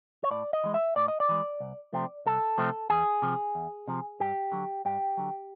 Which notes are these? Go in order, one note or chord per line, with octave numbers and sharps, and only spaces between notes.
C#5
A2 D5
D#5
E3 G#3
E5
A2 D5
D#5
D5
E3 G#3
C2
C3 F3 A3 C4
C2 A4
C3 F3 A3 C4
E2 G#4
C3 F3
E2
C3 F3
G2 G4
D3 F#3
G2 G4
D3 F#3